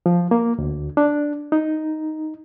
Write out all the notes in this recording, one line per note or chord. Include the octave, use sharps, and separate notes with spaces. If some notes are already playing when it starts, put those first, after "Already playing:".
F3
A#3
D2
D4
D#4